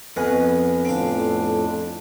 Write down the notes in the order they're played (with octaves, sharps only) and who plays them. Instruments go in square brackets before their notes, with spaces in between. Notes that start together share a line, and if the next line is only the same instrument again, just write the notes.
[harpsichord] F2 D#5 F#5 [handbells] B3 B4 G#5
[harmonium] F2 A2 D4 [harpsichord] C4 F5